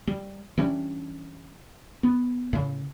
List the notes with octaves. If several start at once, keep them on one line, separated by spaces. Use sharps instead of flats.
G3
E3 G3 C#4 D4
B3
A2 C#3